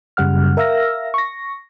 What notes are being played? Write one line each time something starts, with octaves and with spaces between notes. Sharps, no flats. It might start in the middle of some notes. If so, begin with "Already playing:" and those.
F#2 C#3 G3 F#5 F6
A#4 E5 F5 E6 F6 A#6
C#6 A#6